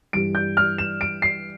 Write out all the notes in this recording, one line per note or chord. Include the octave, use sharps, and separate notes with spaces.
G2 E3 G3 D7
G6
F6
E7
D7
C7